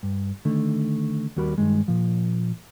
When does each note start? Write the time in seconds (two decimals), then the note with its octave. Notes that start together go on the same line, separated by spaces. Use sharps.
0.03 G2
0.45 D3 D#3 A3
1.36 D#2 G3 F#4 A#4 B5
1.58 G2 D#3 G#3
1.88 A#2 F3